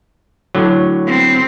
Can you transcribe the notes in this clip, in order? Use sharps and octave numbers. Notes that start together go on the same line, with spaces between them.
A2 D3 F#3
B3 C4